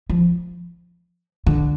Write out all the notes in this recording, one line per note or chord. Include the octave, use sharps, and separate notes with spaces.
F3
D3